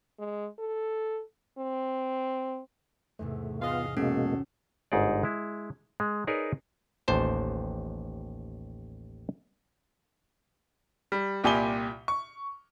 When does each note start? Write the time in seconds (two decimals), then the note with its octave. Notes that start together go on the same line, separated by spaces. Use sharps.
0.19 G#3
0.59 A4
1.58 C4
3.19 E2 G#2 C3 A3
3.62 B3 F4 G#4 D#5 F5
3.97 B2 G#3 A#3 C#4 F#4 G#4 A4
4.92 G1 G#2 D#4 G#4 D5
5.23 G#3 E4
6.00 G#3
6.27 D#4 G#4 A#4 B4 C#5 D5
7.08 A1 D#2 C5 A5
11.12 G3
11.44 C2 A#2 G4 G#5 B5 G7
12.08 C#6